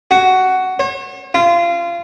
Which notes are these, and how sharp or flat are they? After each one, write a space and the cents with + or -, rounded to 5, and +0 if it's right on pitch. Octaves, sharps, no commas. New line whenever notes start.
F#4 +10
C#5 -45
F4 -25